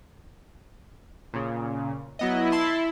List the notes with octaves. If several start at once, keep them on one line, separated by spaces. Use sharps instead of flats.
A#2 C#3
F#3 B3 E4 D#5
A5 C6